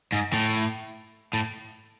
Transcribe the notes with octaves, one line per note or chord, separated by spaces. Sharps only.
G#2
A2
A2